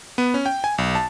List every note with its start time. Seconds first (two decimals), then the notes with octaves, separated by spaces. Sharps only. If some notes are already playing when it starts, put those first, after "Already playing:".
0.18 B3
0.34 C#4
0.46 G5
0.64 G#5
0.78 B1
0.95 A5